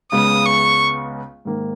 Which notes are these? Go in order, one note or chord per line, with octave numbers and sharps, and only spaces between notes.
C#2 C#3 G#3 B3 D#6
C#6
G#2 D#3 A#3